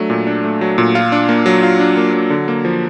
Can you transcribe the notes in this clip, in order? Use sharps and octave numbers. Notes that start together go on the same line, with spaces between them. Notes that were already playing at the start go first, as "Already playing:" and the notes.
Already playing: F#3 A3 D4
A#2
D4
A3
F#3
A#2
F4
D4
A#3
F#3
F4
D4
A#3
F#3
D3
A#3
F3